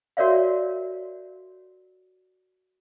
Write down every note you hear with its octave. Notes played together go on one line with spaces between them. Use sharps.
F#4 A#4 C#5 D5 E5 F5